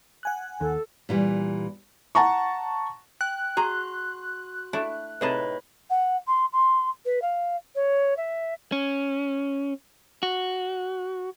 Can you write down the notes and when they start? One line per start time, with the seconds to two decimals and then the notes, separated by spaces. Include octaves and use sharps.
0.23 F#5 G#5 F#6
0.61 D#2 A4
1.09 A#2 E3 G3
2.15 F#5 A5 A#5 C#6
3.21 G5 F#6
3.57 F#4 G#4 A#5 C6
4.73 A3 D4 E4
5.21 A2 C3 D#4 G#4 B4 C#5 A5 B5
5.90 F#5
6.27 C6
6.52 C6
7.05 B4
7.21 F5
7.75 C#5
8.16 E5
8.72 C#4
10.23 F#4